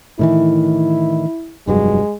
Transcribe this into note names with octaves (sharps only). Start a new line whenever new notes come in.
A2 D#3 E3 E4
F1 G2 F#3 G#3